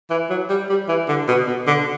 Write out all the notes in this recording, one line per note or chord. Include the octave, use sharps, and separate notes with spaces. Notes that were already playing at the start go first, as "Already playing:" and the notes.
E3
F#3
G3
G3
E3
D3
B2
B2
D3